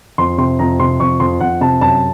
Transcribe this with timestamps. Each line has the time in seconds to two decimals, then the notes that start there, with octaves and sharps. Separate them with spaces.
0.18 F2 C6
0.38 C3 C6
0.59 F2 A#5
0.79 C3 C6
1.00 F2 C#6
1.20 F2 C6
1.40 F2 F#5
1.61 C3 A5
1.81 F#2 A5